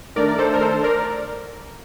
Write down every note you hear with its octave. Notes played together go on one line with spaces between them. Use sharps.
D#3 A3 D4 A#4 D5
D5
A4 C5
A#4
A4 C5
A#4 D5